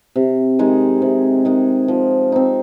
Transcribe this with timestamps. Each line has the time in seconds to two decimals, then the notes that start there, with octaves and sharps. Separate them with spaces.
0.16 C3
0.59 D#3 G#3 D#4
1.02 C3
1.45 D#3 G#3 D#4
1.88 F3
2.32 C4 D#4